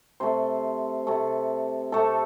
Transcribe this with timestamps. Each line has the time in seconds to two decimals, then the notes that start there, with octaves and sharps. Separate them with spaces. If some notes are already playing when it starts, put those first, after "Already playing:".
0.20 C3 A3 C5
1.07 C3 A3
1.92 C3 A3 A4